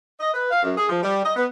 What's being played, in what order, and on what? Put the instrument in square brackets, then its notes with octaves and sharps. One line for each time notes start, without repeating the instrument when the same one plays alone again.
[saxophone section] D#5
B4
F5
F#2
G#4
F3
G3
D#5
B3